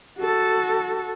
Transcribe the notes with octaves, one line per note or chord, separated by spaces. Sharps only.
F#4 A4